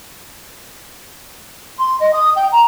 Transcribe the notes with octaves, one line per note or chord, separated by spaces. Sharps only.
C6
D#5
D#6
G5
A#5